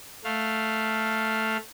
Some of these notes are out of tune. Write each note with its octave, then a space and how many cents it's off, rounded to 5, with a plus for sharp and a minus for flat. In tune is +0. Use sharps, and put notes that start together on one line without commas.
A3 +0 F5 +0